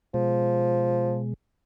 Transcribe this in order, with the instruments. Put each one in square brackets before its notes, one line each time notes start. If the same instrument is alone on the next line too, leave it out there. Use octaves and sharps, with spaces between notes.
[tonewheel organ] B2 G#3 [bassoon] F3